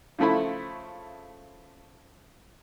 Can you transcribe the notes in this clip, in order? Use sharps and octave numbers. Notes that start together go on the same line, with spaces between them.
C#3 F3 A3 E4 B5